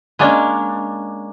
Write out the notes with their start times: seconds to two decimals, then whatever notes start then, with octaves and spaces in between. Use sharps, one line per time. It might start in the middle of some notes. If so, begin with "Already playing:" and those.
0.19 G#3 A#3 C#4 D4